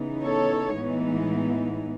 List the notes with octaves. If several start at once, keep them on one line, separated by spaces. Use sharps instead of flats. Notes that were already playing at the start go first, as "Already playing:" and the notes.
Already playing: C#3 E3 B3 D#4
A4 C#5
A2 E3 G#3 B3 D#4